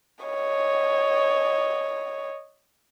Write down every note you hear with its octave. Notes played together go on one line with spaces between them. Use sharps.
C#5 D#5